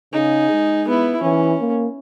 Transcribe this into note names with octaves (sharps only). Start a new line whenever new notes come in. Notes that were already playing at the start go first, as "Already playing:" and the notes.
C#3 D#4 G#4
G#3
B3 E4
E3 C#4
A#3